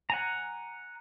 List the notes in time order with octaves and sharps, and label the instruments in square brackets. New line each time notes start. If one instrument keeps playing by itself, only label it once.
[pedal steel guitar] F#5 G#5 A#5